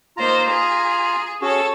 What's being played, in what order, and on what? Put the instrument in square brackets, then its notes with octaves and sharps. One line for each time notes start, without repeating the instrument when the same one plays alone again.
[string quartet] A#3 D#4 C5 [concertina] F4 A#5
[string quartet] G#4
[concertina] C#4 F#4 G#4 [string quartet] A4 C#5